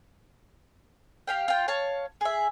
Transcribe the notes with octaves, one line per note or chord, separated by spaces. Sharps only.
G4 F5 G5
F4 G5
C#5 F5 A5
G#4 E5